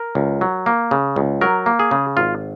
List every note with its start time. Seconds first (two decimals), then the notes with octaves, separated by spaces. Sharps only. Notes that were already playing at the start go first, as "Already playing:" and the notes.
Already playing: A#4
0.15 C#2
0.41 F#3
0.66 A#3
0.91 C#3
1.16 C#2
1.41 F#3 A#4
1.66 A#3
1.79 G#4
1.91 C#3
2.17 G#1 F4